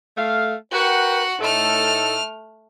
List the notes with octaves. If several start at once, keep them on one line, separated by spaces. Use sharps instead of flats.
A3 F5
F#4 A#4 B4 F#5 G5
A2 A3 D#4 A4 F6